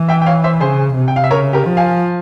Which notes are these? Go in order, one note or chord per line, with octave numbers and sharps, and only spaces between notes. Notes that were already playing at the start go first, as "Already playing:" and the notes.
Already playing: E3
E5 G5
G5
C#5 F5
C5 E5
C#3 G#4 C5
C3
G5
F5
E5
C#3 A#4 C#5
G4 A#4
F3
F5 G#5